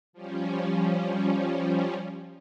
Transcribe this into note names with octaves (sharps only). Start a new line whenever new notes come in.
F3 G3 C#4